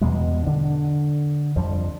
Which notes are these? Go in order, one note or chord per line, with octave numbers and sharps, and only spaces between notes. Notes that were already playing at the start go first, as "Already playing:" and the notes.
E2 B2 G3 G#3
D3 D4
F2 F3 G3